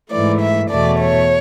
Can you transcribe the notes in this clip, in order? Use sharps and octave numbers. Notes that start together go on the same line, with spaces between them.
G#2 E3 A3 D5
E5
E2 B2 A3 D5
C#5